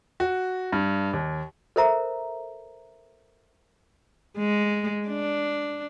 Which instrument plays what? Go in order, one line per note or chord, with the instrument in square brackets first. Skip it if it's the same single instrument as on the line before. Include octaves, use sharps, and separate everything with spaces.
[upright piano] F#4
G2
D#2
[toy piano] A4 A#4 C5 E5 A#5
[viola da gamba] G#3
D4